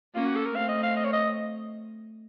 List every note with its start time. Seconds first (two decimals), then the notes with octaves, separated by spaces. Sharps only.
0.15 A#3 C#4 F4
0.25 F#4
0.35 A4
0.45 A#4
0.55 A3 C4 F5
0.69 D#5
0.83 F5
0.96 D#5
1.04 C#5
1.13 D#5